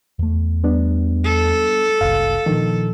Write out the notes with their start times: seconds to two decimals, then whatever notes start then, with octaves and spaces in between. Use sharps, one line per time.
0.19 E2 A3
0.63 G3 B3 D4
1.24 A4
2.01 F#1 C2 F5
2.46 A#2 D#3 F3 D4